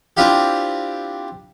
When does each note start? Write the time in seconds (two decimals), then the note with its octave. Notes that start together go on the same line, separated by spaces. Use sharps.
0.17 C4 D4 E4 F4 G4